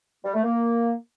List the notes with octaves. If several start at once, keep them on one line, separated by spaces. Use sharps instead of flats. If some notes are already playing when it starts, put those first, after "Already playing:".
G3
A3
A#3